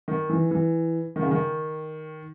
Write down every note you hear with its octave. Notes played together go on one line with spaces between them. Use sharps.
D#3
E3
E3
D#3
C#3
D#3